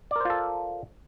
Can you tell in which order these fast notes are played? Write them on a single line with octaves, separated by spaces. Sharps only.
D5 A#4 C5 F4 A4